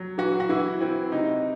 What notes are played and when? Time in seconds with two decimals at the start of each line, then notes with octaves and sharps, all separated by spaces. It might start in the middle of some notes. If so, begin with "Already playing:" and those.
Already playing: F#3
0.18 E3 F#4
0.40 F#4
0.49 E3 E4
0.81 C4 E4
1.12 C3 D#4